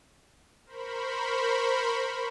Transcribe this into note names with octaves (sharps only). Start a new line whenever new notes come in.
A#4 C5 B5 C#6